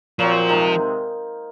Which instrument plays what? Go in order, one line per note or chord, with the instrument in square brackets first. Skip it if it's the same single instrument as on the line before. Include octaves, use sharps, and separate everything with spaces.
[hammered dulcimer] A#2 F#3 C4 [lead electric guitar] F3
[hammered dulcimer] C3 D#3 G#3